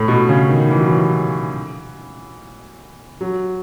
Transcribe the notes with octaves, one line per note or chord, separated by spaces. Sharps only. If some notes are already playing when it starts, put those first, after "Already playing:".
Already playing: A2
B2
C#3
D#3
E3
F#3
E3
F#3